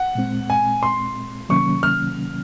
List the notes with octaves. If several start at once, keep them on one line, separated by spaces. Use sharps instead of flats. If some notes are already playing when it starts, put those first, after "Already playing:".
Already playing: F#5
A#2 G#3 C4
G#5
C6
C3 D#3 F#3 A#3 C#4 C#6
F6